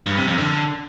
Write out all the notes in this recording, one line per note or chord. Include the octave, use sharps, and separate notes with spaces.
G2
C3
F2
D3